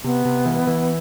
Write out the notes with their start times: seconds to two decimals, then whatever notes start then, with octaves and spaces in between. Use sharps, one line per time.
0.04 C3 B3
0.25 C3
0.46 E3
0.67 E3